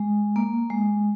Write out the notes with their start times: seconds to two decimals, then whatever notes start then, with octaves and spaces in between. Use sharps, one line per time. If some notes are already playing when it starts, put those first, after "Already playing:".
Already playing: G#3
0.36 A#3
0.70 G#3